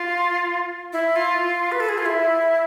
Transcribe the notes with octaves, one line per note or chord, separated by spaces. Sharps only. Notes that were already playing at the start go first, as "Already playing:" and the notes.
Already playing: F4
E4
F4
B4
A4
G#4
F4
E4